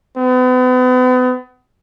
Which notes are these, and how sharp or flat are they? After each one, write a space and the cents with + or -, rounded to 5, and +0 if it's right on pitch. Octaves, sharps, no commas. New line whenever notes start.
B3 +40